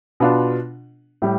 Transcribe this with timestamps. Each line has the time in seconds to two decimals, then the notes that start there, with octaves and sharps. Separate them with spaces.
0.20 B2 B3 D4 F4
1.22 A2 G3